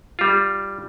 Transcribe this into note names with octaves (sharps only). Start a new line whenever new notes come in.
G3 F4